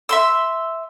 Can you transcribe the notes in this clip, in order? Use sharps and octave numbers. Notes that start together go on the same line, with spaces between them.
E5 C6 E6